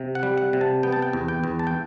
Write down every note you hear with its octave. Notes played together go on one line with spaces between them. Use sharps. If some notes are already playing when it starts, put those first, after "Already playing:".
Already playing: C3
F#5
G3
F#5
C3
A5
B3 G5
A5
G5
E2
G5
E2
A5
G5